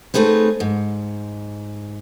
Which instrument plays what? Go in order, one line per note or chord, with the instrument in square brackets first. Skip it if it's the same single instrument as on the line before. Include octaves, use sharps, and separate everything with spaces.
[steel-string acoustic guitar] A3 C4 D#4 G#4 B4
G#2